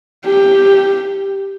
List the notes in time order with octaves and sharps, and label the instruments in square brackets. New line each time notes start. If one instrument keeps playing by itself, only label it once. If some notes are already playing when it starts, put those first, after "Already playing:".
[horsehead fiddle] G4